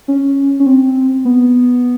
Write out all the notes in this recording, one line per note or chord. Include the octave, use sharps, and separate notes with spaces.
C#4
C#4
C4
B3